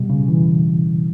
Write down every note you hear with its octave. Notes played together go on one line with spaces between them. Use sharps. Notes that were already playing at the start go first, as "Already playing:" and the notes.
Already playing: B2 G3
C#3
E3